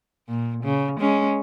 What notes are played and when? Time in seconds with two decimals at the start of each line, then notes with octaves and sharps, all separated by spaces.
0.28 A#2
0.64 C#3
1.00 G#3 C#4